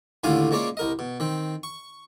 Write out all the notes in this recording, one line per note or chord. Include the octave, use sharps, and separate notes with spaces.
D#2 A2 D3 F4 F5 G#5
A#2 G#3 A#3 C#4 D5
C2 A#4 D#5
B2
D#3 C4
C#6